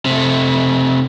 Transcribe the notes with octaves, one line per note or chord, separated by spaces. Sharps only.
C3 A3